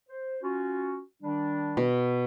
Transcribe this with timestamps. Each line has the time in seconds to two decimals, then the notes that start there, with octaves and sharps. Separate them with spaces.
0.09 C5
0.43 C#4 F4 F#4
1.23 D#3 G3 D4
1.77 B2